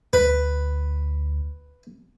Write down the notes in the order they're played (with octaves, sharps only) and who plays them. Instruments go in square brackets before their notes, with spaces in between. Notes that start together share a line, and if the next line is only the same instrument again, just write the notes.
[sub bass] D2 [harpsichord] B4